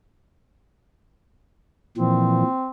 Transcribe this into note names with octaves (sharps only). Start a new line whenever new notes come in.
A#2 E3 F3 C4